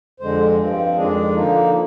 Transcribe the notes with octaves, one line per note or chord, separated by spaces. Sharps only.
F2 D3 G#3 C5
G2 F3 C4
F2 D#3 G#3 D4 G#4
D3 F3 A#3 D#4 F4